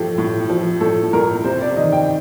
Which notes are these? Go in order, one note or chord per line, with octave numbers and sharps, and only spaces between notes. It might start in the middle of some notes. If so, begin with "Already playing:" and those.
Already playing: A2 F3 G4 A4
A2
F3
A2 A4
A2 A#4
C3 C5
D5
D#3 D#5
G5